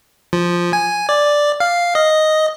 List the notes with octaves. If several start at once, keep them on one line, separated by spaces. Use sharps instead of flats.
F3
G#5
D5
F5
D#5